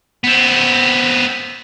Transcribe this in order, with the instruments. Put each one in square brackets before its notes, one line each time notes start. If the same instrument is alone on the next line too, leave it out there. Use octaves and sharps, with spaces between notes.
[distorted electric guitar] B3 C4